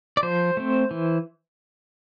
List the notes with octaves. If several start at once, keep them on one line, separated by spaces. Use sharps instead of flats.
D5
F3 C5
A3 C4
E3